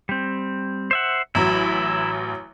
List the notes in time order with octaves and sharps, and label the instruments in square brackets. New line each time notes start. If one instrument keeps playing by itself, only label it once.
[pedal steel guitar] G3 C4
C5 E5 F#5
[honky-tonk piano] A1 F#3 [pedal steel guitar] E4